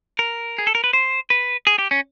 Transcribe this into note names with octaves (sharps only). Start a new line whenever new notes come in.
A#4
G#4
A4
A#4
B4
C5
B4
G#4
G4
C#4